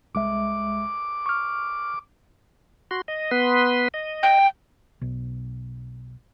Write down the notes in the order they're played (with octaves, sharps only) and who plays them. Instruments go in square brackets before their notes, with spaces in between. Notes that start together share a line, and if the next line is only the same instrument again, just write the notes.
[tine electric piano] C2 G#3 E5 [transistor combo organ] D6
[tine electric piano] C#6 F6
[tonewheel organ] F#4 C6
D#5
B3 B4 C6
D#5
[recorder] G5
[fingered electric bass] B1